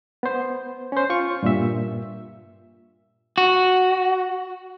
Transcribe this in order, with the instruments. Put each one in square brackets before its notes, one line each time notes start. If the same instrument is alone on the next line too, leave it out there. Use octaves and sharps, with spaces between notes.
[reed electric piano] B3 C5
C#4 C5
F4 C#6
G2 A#2 E5
[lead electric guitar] F#4